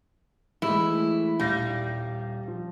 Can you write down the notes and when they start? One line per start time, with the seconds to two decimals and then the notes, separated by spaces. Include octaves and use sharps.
0.62 E3 G#3 A3 E4
1.39 D#1 G3 F5 A#6
2.48 F3